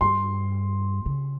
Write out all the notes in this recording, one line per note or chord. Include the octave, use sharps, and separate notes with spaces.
G2 C6
C#3